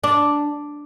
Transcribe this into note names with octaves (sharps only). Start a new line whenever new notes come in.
D4